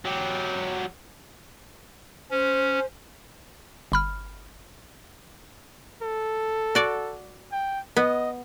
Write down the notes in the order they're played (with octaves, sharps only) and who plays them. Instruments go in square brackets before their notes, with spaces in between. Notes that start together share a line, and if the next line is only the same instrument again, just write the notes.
[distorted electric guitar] F#3 G4
[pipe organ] C#4 [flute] C5
[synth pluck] G1 B5 F6
[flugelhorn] A4
[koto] F#4 D5
[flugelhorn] G5
[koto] B3 [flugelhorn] D#5